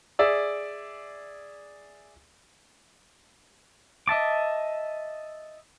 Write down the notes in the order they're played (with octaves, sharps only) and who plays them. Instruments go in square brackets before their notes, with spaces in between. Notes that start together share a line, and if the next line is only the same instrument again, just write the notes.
[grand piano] G#4 D5 E5 E6
[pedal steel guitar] D#5 E5 A5 D6